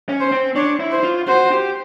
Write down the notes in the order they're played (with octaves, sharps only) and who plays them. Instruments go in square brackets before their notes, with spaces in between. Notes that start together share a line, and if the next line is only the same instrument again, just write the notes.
[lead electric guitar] C#4
[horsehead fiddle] C5
[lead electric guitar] C4
[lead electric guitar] D4 [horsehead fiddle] C#5
[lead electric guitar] E4
[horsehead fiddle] C5
[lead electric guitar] F4
[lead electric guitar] F#4 [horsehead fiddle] C5
[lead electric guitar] G4